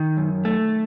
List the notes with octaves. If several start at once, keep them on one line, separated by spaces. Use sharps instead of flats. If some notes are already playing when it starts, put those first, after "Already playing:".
Already playing: D#3
F#2
A3